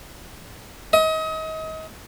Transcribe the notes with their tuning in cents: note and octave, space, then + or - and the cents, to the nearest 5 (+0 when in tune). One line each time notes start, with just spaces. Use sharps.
D#5 +35